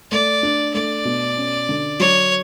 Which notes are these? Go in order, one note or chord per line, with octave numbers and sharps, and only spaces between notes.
A3 D5
D4
A3 D5
B2
C#4
D3
F#3 C#5